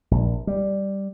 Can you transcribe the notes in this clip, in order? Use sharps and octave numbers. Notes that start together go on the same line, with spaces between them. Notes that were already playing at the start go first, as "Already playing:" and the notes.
A#1
G3